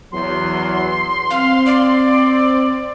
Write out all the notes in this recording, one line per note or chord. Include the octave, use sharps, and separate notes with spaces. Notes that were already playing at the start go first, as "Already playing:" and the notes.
E2 F#3 C6
C4 F5
D5